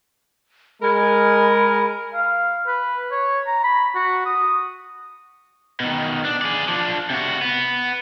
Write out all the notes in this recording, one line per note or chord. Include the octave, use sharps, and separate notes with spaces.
G#3 A#4 B5
F5
B4
C#5
A#5
B5
F#4
D#6
B2 D#3
D4
G#4 D5
F3 D4
C3 F#4
B3